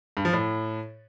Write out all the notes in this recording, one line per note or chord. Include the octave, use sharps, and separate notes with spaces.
G2
F3
A2